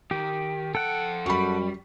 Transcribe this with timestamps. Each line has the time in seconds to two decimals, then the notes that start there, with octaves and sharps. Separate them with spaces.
0.11 D#3 G4
0.75 F2 A4 F#5 G5
1.26 F#2 G3 B5 C#6